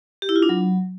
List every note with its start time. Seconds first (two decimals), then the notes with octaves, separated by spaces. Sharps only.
0.22 G4
0.29 E4
0.36 F4
0.42 D4
0.49 F#3